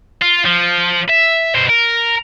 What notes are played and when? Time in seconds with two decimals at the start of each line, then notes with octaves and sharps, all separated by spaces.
0.22 F4
0.46 F3
1.09 E5
1.55 B2 C5
1.69 A#4